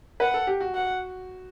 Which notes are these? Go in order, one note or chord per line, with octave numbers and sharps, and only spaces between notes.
B4 F#5
A4
G4
F#4
F#5